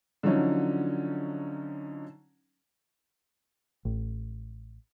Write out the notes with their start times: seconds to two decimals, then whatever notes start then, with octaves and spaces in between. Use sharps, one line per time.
0.23 D3 F3 F#3 C#4 D#4
3.85 A1